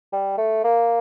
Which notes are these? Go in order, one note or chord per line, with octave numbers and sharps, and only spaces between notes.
G3
A3
A#3